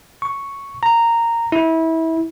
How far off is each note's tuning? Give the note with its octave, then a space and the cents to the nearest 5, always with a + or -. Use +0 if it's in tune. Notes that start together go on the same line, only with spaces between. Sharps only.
C#6 +0
A#5 -10
E4 -25